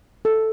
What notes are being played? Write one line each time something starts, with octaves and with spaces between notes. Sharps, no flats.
A4